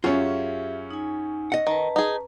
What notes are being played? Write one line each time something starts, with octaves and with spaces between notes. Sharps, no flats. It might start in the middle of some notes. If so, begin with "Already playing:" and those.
F#2 C#4 F4 G4 G#4 E5
D#4 G#5
D#5 F#5
D#3 B4 A5 A#5
D#4 G#4